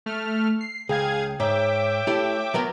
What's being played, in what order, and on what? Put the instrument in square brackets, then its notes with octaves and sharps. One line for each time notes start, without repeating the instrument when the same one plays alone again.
[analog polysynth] A3 F6
C7
[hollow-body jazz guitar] C#2 [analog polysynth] G#4 F5 G#6 [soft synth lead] G5
[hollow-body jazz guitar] G#2 [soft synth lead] C#5 [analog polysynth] E5 G5 D6
[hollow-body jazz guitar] A3 E4 G4
F#3 B3 A#4